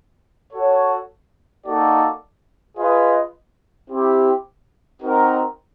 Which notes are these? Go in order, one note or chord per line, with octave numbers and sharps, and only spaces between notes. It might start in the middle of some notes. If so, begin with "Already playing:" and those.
F#4 A4 C#5
A#3 D#4 F#4 A4 D5
F4 G#4 B4 D#5
C4 E4 G4
C4 D#4 F#4 A#4